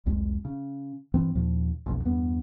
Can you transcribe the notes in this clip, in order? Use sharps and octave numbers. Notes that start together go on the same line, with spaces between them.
F#1 C2 F2 G#3
C#3
G2 E3 C4
D#2 A#2 F3
F#1 B1 F2
E2 G2 B3